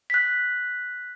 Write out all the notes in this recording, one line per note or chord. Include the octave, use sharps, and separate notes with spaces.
F#6 B6